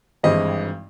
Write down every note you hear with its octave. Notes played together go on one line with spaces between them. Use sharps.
G#1 G2 E3 G#3 C4 D#5